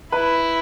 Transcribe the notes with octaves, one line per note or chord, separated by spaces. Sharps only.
E4 B4